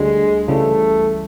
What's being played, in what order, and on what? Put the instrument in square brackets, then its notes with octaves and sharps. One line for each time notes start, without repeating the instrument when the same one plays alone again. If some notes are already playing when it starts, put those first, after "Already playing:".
Already playing: [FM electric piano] D2 D3 G3 [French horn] G#3
[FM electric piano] C#2 C#3 E3 G3 [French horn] A3